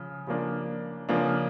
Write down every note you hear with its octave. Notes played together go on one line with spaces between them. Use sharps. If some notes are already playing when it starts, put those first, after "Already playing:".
Already playing: C#3 F3
C#3 F3 A#3 D4
C#3 F3 A#3 D4